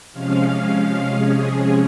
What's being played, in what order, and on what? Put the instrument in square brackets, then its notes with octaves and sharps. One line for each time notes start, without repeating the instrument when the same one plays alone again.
[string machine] C3 F3 G#3 C#4 F5
G#4